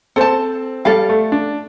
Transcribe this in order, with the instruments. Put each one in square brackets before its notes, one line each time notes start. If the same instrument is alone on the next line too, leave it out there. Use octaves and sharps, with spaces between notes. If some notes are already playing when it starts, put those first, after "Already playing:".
[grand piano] C4 [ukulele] A4 C5 A5
[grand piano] G3 [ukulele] A4 D5 F5
[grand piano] A3
D4